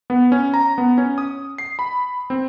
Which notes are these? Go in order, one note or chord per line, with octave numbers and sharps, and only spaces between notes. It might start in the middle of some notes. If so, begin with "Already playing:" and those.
B3
C#4
A#5
B3
C#4
D#6
C7
B5
C4